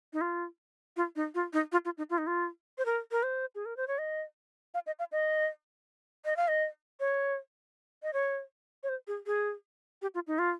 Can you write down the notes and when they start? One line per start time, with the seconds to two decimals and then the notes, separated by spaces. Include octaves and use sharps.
0.13 D#4
0.21 F4
0.97 F4
1.16 D#4
1.35 F4
1.53 D#4
1.72 F4
1.85 F4
1.97 D#4
2.10 F4
2.18 D#4
2.27 F4
2.78 C5
2.85 A#4
3.11 A#4
3.23 C5
3.55 G#4
3.66 A#4
3.77 C5
3.88 C#5
3.98 D#5
4.74 F5
4.87 D#5
4.99 F5
5.12 D#5
6.25 D#5
6.37 F5
6.48 D#5
7.00 C#5
8.03 D#5
8.13 C#5
8.83 C#5
8.89 C5
9.07 G#4
9.26 G#4
10.02 G4
10.14 F4
10.27 D#4
10.39 F4